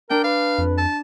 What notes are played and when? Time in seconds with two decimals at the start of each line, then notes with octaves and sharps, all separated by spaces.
0.10 D4 A#4 G5
0.24 B4 F5
0.58 F2
0.78 A5